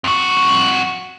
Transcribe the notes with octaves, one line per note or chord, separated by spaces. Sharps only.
F2 F#4